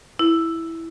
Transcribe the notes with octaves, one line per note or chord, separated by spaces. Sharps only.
E4